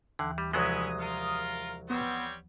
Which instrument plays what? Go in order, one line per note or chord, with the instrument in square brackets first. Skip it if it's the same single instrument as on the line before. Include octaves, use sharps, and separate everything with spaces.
[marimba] D#2 E3 [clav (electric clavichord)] D3
[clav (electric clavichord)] G3
[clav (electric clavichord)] C2 F#3 G#3 [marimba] F3 [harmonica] C#4 E4 [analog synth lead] D#6
[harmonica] F4 A#4 F5
[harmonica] G3 C4 C#5 [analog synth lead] B3